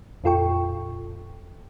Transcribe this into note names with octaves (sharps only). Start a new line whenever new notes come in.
F2 A#2 F4 A4 G5 C#6